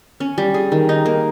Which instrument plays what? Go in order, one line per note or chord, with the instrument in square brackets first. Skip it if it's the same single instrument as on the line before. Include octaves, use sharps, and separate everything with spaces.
[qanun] C#4
G3
G#4
D#3
D#4
A#3